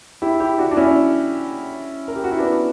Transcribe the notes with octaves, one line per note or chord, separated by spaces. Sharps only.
E4 G4
E4 G4
D4 F#4
D4
C#4 E4
A#4
G4
F#4
E4
B3 D4